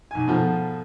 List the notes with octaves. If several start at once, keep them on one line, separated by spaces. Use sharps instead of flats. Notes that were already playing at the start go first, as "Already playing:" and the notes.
B1 G#5
G#2 B2 F3 A3